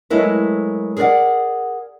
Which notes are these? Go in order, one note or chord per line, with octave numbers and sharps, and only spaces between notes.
F#3 G#3 A3 E4 A#4 B4
G#4 A#4 B4 D5 F#5